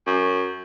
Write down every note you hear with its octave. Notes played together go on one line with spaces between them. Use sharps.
F#2